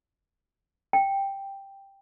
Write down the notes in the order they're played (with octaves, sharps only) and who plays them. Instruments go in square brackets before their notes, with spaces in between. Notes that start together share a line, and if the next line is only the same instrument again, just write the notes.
[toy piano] G5